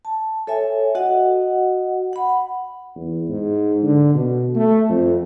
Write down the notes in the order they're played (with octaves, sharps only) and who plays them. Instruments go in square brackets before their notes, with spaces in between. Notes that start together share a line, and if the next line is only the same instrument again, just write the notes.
[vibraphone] A5
A4 C#5 E5 G#5
F#4 D#5 F#5
F#5 B5
[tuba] E2
G#2
D3
B2
A3
F2